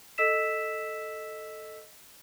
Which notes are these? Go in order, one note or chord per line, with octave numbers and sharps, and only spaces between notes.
A4 D#5 E6 B6 E7